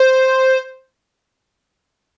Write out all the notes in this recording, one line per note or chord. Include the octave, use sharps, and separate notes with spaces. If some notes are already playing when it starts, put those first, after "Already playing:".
Already playing: C5